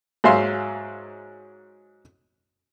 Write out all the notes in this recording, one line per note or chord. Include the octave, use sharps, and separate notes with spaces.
G#2 F#3 E5 F5 C6